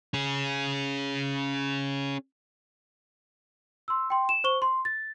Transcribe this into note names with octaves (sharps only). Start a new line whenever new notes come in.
C#4 G#4
C6 E6
G5 C6
E7
C5 C#6 G7
C6
A6